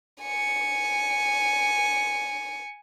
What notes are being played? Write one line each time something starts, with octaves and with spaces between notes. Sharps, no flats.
G#5 C#7